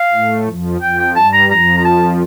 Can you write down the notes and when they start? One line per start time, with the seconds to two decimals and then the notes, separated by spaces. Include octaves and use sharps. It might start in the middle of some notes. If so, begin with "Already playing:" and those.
Already playing: F5
0.12 A2 A3
0.47 F2 F3
0.81 F2 F3 G5
0.98 G5
1.15 G2 G3 A5
1.33 A#5
1.50 F2 F3 A#5
1.78 A#5
1.85 A5